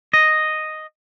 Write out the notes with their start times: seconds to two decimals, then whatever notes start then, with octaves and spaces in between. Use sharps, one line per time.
0.13 D#5